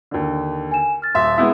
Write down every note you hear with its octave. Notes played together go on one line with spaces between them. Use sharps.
D#2 D3
G#5 E7
F6 A6
D#1 E5 C6 E6 A6
G#3 B3 E4 E5